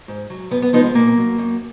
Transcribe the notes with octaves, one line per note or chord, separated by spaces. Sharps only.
G#2
F#3
F#2 B3
B3
F3 G#3 B3 D#4
B3
A#2 A#3
F#3
F#2